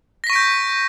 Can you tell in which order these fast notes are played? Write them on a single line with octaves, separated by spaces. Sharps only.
A#6 B6 C#6 D7 G6